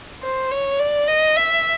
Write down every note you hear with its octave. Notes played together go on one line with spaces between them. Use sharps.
C5
C#5
D5
D#5
E5